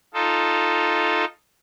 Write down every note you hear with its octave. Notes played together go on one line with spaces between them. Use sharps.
D#4 F4 A4